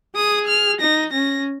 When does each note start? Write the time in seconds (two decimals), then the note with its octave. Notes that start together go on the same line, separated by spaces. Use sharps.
0.16 G#4 D#6
0.48 F6
0.81 D#4 A#6
1.13 C#4 A#6